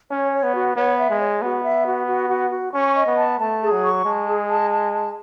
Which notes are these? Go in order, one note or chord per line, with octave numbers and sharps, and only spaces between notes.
C#4 C#5
C#5
B3
F#4
B3 C#5
E5
G#3
C#5
B3 F#4
E5
F#4
F#4
F#4
F#4
C#4 C#6
D#5
B3
A5
A3 A5
G#4
F#3
C#6
G#3 A5
G#4
A5
A5
A5